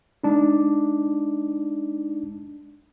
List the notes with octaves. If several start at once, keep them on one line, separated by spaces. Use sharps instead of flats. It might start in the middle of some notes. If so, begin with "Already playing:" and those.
G#3 D4 D#4